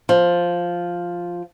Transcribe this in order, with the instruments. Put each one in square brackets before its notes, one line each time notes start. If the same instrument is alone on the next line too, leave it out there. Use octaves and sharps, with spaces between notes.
[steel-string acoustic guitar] F3